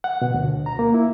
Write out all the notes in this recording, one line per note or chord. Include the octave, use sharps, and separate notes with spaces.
F#5
B2
D2
A#5
A#3
E4